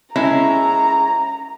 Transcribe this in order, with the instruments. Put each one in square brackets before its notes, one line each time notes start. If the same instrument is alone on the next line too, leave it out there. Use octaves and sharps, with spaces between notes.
[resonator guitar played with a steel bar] G#3 C#4 E4 [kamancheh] A#5